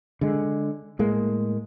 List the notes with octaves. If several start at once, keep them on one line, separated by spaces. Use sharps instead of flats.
D3 G#3
A2 G#3 A#3